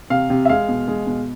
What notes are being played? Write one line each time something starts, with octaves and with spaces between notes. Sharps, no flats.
C3 F5
C3
E5
G#3 F5
B2
G#3
B2